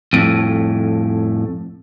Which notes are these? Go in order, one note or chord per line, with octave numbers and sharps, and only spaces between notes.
F2 A2